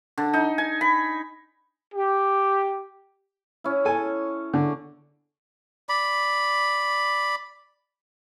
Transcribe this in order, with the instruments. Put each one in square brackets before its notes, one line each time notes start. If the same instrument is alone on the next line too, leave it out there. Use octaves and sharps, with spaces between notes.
[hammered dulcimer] D3
D#4
G#5
B5
[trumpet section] G4
[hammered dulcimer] C#4 E4
[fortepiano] A4 G#5
D3
[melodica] D5 B5